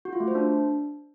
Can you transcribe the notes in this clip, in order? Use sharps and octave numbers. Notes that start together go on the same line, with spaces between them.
F#4
F4
A3
C5
D4